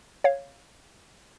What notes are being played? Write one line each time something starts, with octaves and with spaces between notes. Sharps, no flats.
C#5 F5